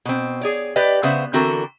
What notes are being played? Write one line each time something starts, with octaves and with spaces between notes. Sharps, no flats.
B2 C4
G#4 C#5 D5
G4 B4 D5 D#5
C#3 B3 C5 E5
D3 E3 C4 F#4 A4 A#4